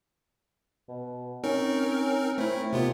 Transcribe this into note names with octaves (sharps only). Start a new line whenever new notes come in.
B2
C4 C#4 D#4 A#4
A3 C4 E4
D#2 C3 B3 F4